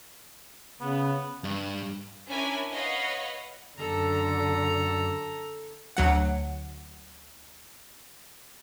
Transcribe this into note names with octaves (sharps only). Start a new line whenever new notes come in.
C#3 B3
G2
C#4 D4 E4 A#4 G#5 B5
B4 C#5 D#5 F5 F#5 B5
F#2 D3 A4 A#5
D2 F#3 F#5